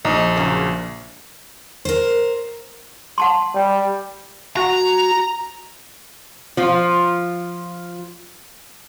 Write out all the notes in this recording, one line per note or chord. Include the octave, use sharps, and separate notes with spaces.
A#1 D#4
A#2 C#3 F#3
A#4 C5
F#5 A5 C6
G3
F#4 A#5
F3 F4